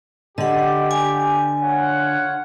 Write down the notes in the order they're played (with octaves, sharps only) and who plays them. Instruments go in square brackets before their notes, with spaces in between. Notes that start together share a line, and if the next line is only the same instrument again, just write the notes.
[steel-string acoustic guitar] D3 [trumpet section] G4 [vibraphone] D#5 F#5
[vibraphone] G#5
[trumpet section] F4 C#5 F#5